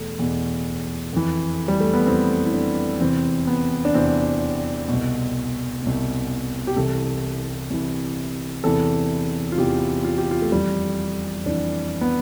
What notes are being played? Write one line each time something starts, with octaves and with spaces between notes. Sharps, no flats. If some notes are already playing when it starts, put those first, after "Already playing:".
Already playing: E2 B2 A3
E2 B2
F2 E3
G3
A3
B3
F2 E3 C4
E4
D4
E2 C3 E3 C4
B3
D4
E2 C3 E3 C4
C2 B2
C2 B2
G4
C2 C3 E3 A4
C2 C3 E3
E2 C3 E3 A4
F4
E2 C3 E3 G4
F4
G4
F4
A3
F2 E3 G3
F2 E3 D4
B3